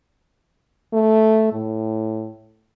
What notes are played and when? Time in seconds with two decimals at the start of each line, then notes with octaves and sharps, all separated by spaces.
0.93 A3
1.53 A2